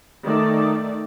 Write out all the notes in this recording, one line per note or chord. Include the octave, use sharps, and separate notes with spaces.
D#3 A3 D5